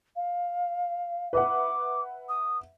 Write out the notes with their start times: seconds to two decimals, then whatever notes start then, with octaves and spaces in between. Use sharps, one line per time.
0.16 F5
1.33 B4 E5 F#5 D6
2.28 D#6